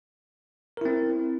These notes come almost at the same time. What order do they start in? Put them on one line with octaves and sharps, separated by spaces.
A#4 E4 C4